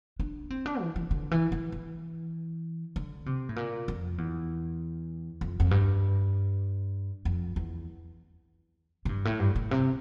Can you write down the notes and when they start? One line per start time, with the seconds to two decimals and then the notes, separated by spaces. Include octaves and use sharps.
0.20 D4
0.50 C4
0.66 D4
0.81 E3
0.96 E3
1.11 D3
1.31 E3
1.52 E3
1.72 E3
2.96 D3
3.26 C3
3.49 A2
3.56 A#2
3.88 F2
4.18 E2
5.41 F2
5.60 F2
5.71 G2
7.25 F2
7.56 E2
9.05 A2
9.09 G2
9.25 A2
9.40 G2
9.56 A2
9.71 C3